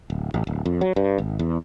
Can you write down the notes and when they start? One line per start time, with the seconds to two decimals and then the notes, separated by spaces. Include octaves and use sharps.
0.10 D1
0.34 A1
0.47 D1
0.66 F2
0.81 F#3
0.96 G2
1.18 G#1
1.39 E2